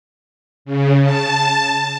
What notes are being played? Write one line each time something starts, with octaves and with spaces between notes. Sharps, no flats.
C#3
A5